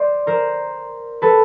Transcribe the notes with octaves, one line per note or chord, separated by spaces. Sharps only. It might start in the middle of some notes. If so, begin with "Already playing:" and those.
Already playing: C5 D5
A#4 C5
A4 B4